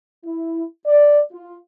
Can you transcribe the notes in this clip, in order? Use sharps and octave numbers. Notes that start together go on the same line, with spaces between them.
E4
D5
F4